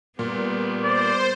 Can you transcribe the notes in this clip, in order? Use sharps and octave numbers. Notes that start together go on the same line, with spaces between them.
A#2 G3 B3
C5 D5